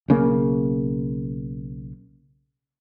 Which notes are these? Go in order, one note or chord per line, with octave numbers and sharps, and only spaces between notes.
B1 C#3 A#3